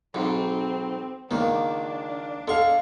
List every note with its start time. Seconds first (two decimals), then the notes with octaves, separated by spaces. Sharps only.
0.14 B1 G#2 C4
1.31 C#2 D#3 A#3 D4
2.48 G#3 A4 F5 C#6